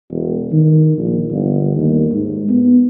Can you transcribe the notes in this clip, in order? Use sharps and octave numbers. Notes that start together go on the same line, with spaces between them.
E1
D#3
A#1
G1
D#2
G#2
B3